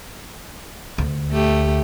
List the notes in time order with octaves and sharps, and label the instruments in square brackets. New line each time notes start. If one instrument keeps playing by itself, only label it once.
[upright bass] D2
[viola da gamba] A3 G4